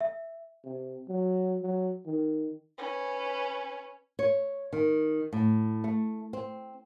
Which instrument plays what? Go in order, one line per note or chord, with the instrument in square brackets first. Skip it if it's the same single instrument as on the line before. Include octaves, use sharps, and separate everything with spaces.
[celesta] E5
[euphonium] C3
F#3
F#3
D#3
[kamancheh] C#4 B4
[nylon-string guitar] C#5
D#3
A2
A3
C4